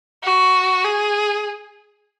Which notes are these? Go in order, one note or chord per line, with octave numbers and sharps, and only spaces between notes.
F#4
G#4